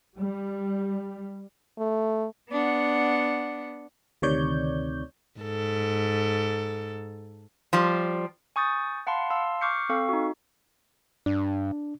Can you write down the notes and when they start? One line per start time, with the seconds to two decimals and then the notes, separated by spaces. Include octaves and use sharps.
0.17 G3
1.79 A3
2.50 B3 D4 F#5
4.22 D2 C3 D#3 C#5 D5 G6
5.40 G#2 A4
7.73 F3 G3
8.56 G#5 C#6 D#6 G6 A6
9.07 F5 F#5 A5 B5 C6
9.30 F5 A5 C6 E6
9.61 C#6 D6 F6 G6 C7 C#7
9.89 C4 A4 F5 C#6
10.09 D#4 F#4
11.26 G2 D4